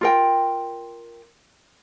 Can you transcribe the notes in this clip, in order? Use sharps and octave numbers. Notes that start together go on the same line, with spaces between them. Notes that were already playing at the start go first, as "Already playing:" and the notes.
F4 A#4 G5